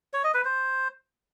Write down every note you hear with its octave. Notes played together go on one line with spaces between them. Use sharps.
C#5
D#5
B4
C5